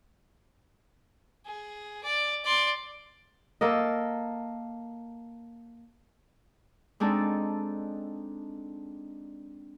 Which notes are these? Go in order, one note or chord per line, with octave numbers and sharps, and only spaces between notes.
G#4
D5
D5 C6
A#3 A4 A#4 D#5
G#3 C4 D4 D#4 A4